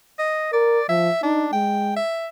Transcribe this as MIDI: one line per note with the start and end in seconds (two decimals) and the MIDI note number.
0.19 0.49 75
0.53 0.80 70
0.53 0.85 74
0.89 1.09 53
0.89 1.21 76
1.23 1.51 62
1.23 1.47 63
1.53 1.99 56
1.53 1.95 79
1.96 2.27 76